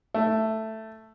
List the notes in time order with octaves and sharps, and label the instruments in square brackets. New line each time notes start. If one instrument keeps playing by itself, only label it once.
[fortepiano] A3